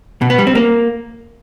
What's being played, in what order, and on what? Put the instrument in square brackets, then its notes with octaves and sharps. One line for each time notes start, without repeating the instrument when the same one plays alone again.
[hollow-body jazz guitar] B2
B3
G3
C4
A#3